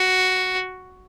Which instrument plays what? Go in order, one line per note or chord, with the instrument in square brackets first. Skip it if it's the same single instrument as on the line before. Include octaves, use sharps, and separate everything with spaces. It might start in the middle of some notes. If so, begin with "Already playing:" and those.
Already playing: [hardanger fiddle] F#4